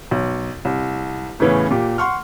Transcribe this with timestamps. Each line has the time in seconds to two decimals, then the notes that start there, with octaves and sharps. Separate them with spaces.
0.11 B1
0.65 C2
1.40 A2 C#3 E3 B3 C#4
1.70 A#2 G4
1.98 F#5 C6 C#6 F6